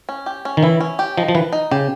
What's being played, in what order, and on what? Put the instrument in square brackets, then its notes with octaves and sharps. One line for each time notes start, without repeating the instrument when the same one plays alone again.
[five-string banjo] C#4
G4
C#4
[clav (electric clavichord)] D#3
[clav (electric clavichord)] E3 [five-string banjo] E4
[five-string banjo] C#4
G4
[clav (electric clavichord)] F3 [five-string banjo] D#4
[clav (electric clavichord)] F3
[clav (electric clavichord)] E3 [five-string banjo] B4
[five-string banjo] D#4
[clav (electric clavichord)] C#3 [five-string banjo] G4